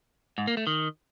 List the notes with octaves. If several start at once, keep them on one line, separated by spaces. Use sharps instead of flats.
G#2
A#3
A3
D#3